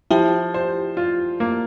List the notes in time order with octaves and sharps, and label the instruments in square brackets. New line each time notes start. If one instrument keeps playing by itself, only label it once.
[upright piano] F3 [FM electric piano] E4 G4
[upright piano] C5
F4
A#3